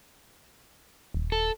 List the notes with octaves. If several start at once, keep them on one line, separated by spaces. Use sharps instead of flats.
D#1
A4